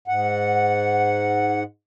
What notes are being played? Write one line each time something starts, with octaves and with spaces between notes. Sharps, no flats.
G#2 F#5